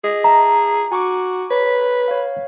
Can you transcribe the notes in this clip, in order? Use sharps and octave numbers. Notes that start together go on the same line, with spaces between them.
G#4 D#5
E5 A5 A#5
F#4 G#5 C#6 D6
B4 C#5 B6
C#5 F5